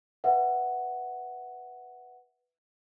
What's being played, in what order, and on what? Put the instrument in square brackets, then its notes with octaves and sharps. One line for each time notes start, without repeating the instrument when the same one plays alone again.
[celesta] B4 E5 F#5